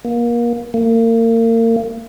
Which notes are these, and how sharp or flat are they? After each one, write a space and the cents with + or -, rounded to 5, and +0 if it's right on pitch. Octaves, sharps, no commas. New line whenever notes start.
A#3 +30
A#3 -35